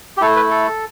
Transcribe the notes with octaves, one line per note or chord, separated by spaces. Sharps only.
G4
A3 E4 A4
B4
A4